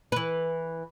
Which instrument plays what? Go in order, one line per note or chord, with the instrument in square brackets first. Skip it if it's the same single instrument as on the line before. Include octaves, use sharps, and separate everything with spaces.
[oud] E3 B4